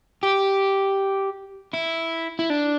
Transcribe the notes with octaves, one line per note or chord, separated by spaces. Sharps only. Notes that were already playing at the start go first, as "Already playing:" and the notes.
G4
E4
E4
D4